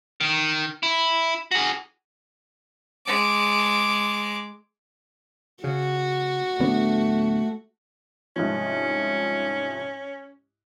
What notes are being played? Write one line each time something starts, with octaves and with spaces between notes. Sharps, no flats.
D#3
E4
F#4 G#4
G#3 D6
C#3 F#4
D1 A3 B3 D4
C2 G#2 F3 C#4